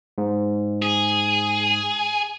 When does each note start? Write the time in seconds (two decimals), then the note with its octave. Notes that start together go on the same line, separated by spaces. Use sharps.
0.18 G#2
0.82 G#4